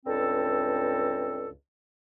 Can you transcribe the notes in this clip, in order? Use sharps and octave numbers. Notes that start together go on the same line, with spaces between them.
C#2 G2 C4 A4